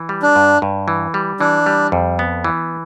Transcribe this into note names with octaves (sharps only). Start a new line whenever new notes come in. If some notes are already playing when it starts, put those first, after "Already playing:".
Already playing: E3
G3
D4
G2
G2
E3
G3
E3 D4
G3
F2
B3
E3